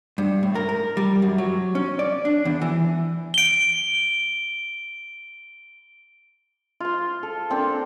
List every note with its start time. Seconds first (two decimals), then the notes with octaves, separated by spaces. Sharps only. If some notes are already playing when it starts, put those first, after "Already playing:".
0.18 G2
0.43 A2
0.55 A#4
0.69 A#4
0.97 G3
1.22 F#2
1.38 F#3
1.75 C#4
1.99 D5
2.25 D4
2.45 E2
2.62 E3
3.34 D7 G7
6.80 F4 C5
7.23 A4
7.50 A#3 C4 D4 A4